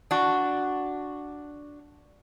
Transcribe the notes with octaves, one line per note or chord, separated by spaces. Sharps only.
D4 F#4